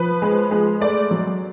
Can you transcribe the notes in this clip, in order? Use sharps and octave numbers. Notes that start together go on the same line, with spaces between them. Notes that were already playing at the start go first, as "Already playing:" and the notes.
Already playing: F3 B4
G#3
G#3
A3 D5
F#3